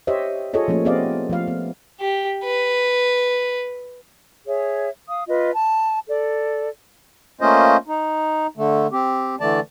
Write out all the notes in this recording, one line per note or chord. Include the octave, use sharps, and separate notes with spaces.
G4 C5 C#5 D#5 E5
F4 G#4 A4 C#5 D#5
F3 A3 A#3 C#4
B3 C4 G4 D5 D#5 F5
F3 A3 F5
B3
G4
B4
G#4 C#5 E5
F5 D#6
F4 B4 D#5
A5
A4 D5
A3 A#3 C#4 F4 C5 D#5
D#4
D3 A3
C4 G4
D3 E3 A3 D5 A5